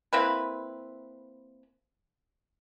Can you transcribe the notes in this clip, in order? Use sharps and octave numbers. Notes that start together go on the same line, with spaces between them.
A#3 C4 E4 B4